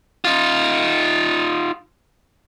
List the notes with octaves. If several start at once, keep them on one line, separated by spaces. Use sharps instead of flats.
D#4 F4